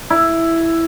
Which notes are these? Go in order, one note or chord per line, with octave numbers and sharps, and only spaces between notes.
E4